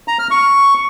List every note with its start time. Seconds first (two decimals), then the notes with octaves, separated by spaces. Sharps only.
0.08 A#5
0.19 F6
0.31 C#6